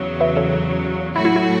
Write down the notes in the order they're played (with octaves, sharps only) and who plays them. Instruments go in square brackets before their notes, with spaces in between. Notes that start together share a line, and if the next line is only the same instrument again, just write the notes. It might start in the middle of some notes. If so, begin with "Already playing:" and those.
Already playing: [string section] E2 C#3 F#3
[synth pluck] B4 E5
A4 C#5
[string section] A2 F#3 A3 F#4 [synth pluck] E4
[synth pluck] E4
E4